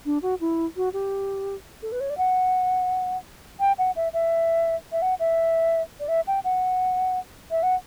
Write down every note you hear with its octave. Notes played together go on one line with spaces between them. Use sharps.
D4
F#4
E4
F#4
G4
A4
B4
C#5
D5
F#5
G5
F#5
E5
E5
E5
F#5
E5
D5
E5
G5
F#5
E5
F#5